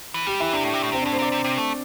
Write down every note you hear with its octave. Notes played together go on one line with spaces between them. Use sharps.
E3
G3 G4
E3 E4
C3 D4
A2
C3
A2
C3 C4
D4
A2
C5
C3 D5
C3
C3
A3